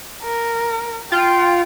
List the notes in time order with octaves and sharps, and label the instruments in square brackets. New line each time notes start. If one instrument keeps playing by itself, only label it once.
[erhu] A#4
[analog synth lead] F4 [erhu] G5